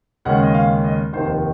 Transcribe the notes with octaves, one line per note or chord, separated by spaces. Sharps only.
D#2 C#3 G#3 C#4 F#5
D#5
F5
D#5
F1 D#2 D#3 C5